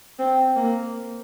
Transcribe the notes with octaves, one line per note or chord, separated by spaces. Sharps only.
C4
A#3